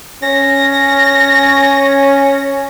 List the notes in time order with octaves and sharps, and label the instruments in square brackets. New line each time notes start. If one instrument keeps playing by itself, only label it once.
[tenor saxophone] C#4 [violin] A#6